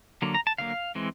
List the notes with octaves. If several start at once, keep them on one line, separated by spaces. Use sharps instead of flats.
D3 F#3 A#3
A#5
A5
D3 F#3 A#3 F5
E3 G#3 C4